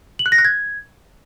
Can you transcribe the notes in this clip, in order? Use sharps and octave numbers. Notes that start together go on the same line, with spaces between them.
F#7
F#6
A#6
F#6
G#6